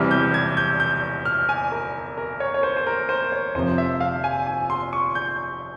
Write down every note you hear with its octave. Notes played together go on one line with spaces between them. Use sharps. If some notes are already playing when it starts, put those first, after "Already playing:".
Already playing: E1 E2 C3 E3 G3 F6
G6
G#6
G6
G6
F6
G#5
A#4
A#4
C#5
C#5
C5
C5
A#4
C5
C#5
F1 F2 C3 F3 C5
E5
F5
G#5
G#5
C6
C#6
G6